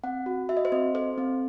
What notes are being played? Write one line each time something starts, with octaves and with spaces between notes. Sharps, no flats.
C4 F#5
F#4
F#4 E5
D#5
C5
C4 D#5
A4 C5
C4